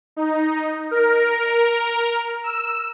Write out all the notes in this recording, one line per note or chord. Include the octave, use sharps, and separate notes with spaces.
D#4
A#4
E6